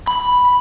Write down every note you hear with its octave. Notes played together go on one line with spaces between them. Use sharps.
B5